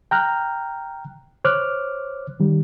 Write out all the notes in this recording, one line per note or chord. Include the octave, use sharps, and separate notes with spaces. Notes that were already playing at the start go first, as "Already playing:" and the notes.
G5 A#5 F6 F#6
C5 C#5 D6 F6 F#6
D#3 G3